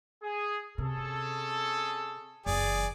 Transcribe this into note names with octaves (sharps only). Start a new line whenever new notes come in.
G#4
C3 C#4 G#4 A4
F#1 E3 G#4 D5